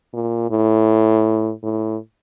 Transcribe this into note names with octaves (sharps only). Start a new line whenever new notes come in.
A#2
A2
A2